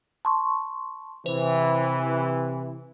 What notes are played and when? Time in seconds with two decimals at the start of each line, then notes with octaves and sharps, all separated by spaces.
0.25 A5 C6 C#6
1.26 C3 E3 C5